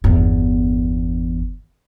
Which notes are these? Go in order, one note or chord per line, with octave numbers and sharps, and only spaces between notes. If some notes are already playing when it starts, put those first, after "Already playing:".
G1 E2